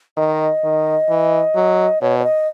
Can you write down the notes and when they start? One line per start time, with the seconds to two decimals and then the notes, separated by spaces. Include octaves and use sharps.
0.17 D#3 D#5
0.64 D#3
1.10 E3
1.55 F#3
2.01 B2 C#5
2.19 C#5
2.24 D#5